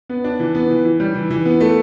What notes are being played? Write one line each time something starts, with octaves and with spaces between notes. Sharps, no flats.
B3
D4
E3
B3
E3
E3
G3
E3
E3
B3
A3